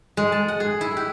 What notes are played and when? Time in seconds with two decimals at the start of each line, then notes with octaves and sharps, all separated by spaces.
0.17 G#3
0.32 A5
0.48 F#5
0.60 G#4
0.81 E4
0.97 G4